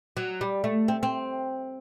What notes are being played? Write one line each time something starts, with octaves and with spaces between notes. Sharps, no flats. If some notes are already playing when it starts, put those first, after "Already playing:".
F#3
G3
A3
C4
C4